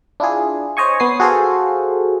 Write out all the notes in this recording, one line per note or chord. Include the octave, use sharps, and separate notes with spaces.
D4 E4 F4 G#4
C5 C#5 D#5 G#5 C#6
B3 D#6 C7
F#4 G#4 A4 C5 F5